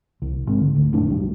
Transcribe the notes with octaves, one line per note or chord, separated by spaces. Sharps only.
C2
G#1 G#2 C4
D3
D2
F1 F#2 A2 D4
B1 F#2 B2 G3